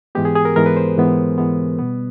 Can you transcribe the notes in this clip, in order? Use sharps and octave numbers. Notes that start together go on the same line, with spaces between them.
G#2 E3 G#3 B3 G4
G#4
G#4
A#4
G#2 E3 G#3 B3 A#4
B4
C5
G#2 E3 G#3 B3
G#2 E3 G#3 B3
B2 G3 B3